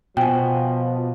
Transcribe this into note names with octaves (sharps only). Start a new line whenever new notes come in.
B2 F3 G5 G#5